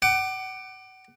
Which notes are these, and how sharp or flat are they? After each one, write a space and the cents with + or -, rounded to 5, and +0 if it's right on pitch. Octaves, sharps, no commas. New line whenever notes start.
F#5 +35 D6 +20